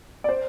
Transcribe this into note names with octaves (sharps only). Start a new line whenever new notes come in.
D5
C5